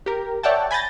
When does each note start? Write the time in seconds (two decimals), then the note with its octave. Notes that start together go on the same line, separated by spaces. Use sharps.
0.06 G4 A#4
0.43 C#5 D5 E5 F#5 G5 A5
0.71 G#5 B5 G6 A6 A#6